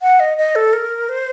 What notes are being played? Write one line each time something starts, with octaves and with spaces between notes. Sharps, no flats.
F#5
D#5
D#5
A4
A#4
C5